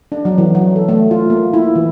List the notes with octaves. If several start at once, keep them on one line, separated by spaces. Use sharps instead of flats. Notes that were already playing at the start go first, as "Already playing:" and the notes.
D4
F#3
E3
F#3
A4
A3
F4
A#3
E4
E3